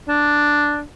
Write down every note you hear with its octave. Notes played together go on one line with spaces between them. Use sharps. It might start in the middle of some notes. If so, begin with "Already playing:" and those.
D4